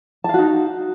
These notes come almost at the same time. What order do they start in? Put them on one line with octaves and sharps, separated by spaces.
A5 F5 F#4 D#4